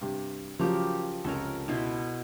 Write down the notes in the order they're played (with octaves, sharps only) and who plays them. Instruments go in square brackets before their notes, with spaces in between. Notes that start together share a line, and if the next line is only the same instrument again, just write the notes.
[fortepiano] G2 C3
[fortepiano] C#3 [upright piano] F3 F#3 [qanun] G4 A#4
[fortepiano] C#2 C3 C#4 [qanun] A4 A#4
[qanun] B2 E4 C6